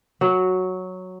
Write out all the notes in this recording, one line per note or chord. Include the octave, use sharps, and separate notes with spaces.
F#3